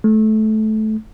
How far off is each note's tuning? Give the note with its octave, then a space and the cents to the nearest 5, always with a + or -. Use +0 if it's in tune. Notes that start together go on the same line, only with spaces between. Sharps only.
A3 -20